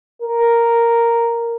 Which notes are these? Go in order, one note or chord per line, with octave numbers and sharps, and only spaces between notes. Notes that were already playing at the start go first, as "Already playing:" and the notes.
A#4